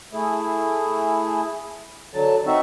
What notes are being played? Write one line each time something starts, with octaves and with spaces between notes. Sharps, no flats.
A3 E4 G#4
D3 F#3 A5
C4 D#4 F#4 E5